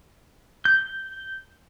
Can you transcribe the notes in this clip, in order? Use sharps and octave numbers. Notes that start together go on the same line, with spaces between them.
G6